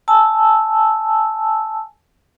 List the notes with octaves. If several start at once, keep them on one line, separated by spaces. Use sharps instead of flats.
G#5 A5 E6